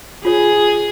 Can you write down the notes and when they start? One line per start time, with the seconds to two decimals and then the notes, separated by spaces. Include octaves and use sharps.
0.25 F4 G#4 C#5